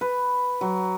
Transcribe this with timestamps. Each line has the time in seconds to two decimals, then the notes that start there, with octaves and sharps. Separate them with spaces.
0.01 B4
0.61 F#3